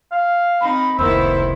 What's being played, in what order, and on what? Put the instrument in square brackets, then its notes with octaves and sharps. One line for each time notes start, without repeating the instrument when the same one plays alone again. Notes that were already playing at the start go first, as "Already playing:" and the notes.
[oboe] F5
[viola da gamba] C4 D#4 [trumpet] B5
[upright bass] F1 C#2 [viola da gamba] D#3 B3 E4 [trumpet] C5 [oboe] E6